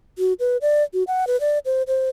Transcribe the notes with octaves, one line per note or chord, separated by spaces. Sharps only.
F#4
B4
D5
F#4
F#5
B4
D5
C5
C5